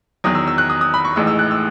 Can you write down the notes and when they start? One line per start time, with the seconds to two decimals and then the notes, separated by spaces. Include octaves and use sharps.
0.24 E2 D#3 F#3 D#6
0.35 E6
0.48 E6
0.58 F#6
0.70 D#6
0.81 D#6
0.94 B5
1.05 C#6
1.16 A1 A2 E3 G#3 D#4 E6
1.27 E6
1.39 F#6
1.51 E6